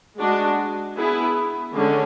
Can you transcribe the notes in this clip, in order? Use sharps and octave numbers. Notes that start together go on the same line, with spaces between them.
G#3 D4 F#4
B3 E4 G#4
D3 G#3 C#4